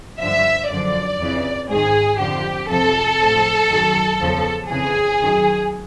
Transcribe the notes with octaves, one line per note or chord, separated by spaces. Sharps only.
G2 D3 F3 E5
F#2 D3 F3 D5
F2 C#3 E3
G#2 D#3 G#4
F2 D3 F3 G4
F2 C3 F3 A4
A2 F3
F#2 D#3
E2 C#3 F3
F2 C#3 E3 G#4
F#2 D#3